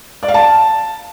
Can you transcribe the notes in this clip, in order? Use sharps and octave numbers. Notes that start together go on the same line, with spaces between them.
D5
F5
A5